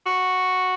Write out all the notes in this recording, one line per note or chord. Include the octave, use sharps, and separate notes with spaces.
F#4